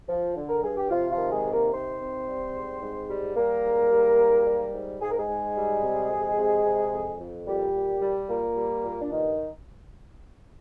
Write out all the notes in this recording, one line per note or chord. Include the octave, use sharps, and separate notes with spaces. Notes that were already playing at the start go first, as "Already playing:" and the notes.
F3
D3
A#4
G2 G#4
G4
C3 F3 F4
F3 F4
D#3
G#3 G#4
C3
A#3 A#4
D#3 C4 C5
C3
G3
G#2
G#2
G3
G3 A#3 A#4
G#2
G3
G#2
G3
G#2
G#2 G#4
A#4
G#3 G#4
G#2
G3
C3
F2
C3
C3
F2
F2
A#2 G3 G4
A#2
G3
A#2 A#3 A#4
G3
A#2
D4
G2 D#3 D#4